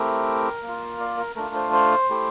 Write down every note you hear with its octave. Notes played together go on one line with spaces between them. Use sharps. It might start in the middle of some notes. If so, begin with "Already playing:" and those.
Already playing: A3 C4 E4 G4 A#4
A#3
F4
D5
A#4
A3 D4 F4 A#4
C5
C5
A3 E4 G4